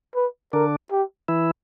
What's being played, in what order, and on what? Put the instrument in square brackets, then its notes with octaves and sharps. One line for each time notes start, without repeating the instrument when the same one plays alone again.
[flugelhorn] B4
[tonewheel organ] D3 D4 [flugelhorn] A#4
[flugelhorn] G4
[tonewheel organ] E3 E4